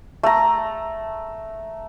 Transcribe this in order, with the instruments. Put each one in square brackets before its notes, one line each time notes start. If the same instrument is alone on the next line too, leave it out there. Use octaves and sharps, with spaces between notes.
[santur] A3 A#5